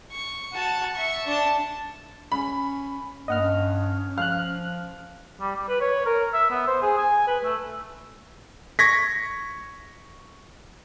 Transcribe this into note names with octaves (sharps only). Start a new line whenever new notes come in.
C#6
F#4 A5
E5 C#6
D4 A5
C#4 B5
G2 A#3 D#5 F#5 F6
C#4
F3 F5 F6 F#6
G3
G3
B4
C#5
A#4
E5
B3
C5
G#4
G#5
B4
A3
C#6 G#6 A#6 B6